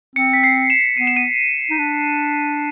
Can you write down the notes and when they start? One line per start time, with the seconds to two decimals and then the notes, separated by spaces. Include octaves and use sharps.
0.16 C4 C#7
0.33 B6
0.44 C7
0.70 E7
0.97 B3 D#7
1.07 E7
1.17 D#7
1.70 D#4
1.78 D4